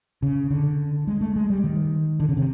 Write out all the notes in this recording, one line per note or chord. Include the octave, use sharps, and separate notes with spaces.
C#3
D3
G#3
A3
G#3
G3
D#3
D3
C#3
C3